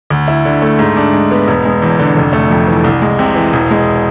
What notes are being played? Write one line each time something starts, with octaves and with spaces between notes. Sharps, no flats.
D2
E4
D3
A3
G#2
D4
G#3
B3
E1
G#3
E2
D3
F1
A3
F2
E3
C2
G#3
C3
E3
E1
G#3